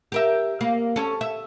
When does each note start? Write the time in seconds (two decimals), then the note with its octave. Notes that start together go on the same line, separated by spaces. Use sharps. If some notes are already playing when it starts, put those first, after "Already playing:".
0.12 G4 A#4 E5
0.61 A#3
0.96 C#4 A4
1.21 E5